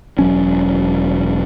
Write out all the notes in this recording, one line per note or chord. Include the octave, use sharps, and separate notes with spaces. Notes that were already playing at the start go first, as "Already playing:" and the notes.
E1 F#3 C#4